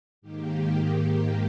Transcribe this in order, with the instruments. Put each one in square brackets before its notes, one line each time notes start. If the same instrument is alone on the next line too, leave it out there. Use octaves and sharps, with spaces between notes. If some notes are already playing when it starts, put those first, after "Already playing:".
[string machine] G#2 D#3 A#3 G4